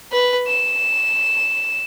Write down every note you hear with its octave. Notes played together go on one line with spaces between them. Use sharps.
B4
E7